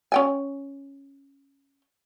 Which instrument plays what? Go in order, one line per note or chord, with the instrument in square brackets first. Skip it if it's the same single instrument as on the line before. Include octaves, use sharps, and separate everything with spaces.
[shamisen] C#4 G5 G#5